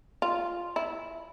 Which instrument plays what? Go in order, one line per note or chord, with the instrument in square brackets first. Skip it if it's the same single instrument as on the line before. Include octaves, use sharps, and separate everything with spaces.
[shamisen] F4
E4